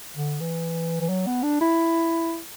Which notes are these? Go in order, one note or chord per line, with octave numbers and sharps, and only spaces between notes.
D3
E3
E3
F#3
B3
D4
E4